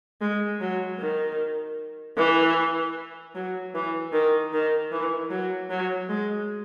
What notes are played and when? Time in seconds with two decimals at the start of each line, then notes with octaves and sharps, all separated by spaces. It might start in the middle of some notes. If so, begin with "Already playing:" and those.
0.21 G#3
0.61 F#3
0.99 D#3
2.17 E3
3.35 F#3
3.75 E3
4.13 D#3
4.53 D#3
4.92 E3
5.30 F#3
5.70 F#3
6.09 G#3